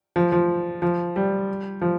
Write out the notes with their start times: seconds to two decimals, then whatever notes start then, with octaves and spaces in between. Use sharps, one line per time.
0.16 F3
0.32 F3
0.82 F3
1.16 G3
1.82 F3